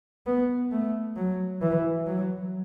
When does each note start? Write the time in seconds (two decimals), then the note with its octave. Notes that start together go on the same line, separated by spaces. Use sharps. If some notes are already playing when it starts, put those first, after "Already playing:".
0.27 B3
0.72 A3
1.17 F#3
1.61 E3
2.07 F#3